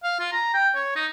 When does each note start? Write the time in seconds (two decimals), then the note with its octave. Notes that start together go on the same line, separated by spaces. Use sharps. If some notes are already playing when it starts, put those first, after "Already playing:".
0.04 F5
0.19 F4
0.32 A#5
0.54 G5
0.75 C#5
0.96 D#4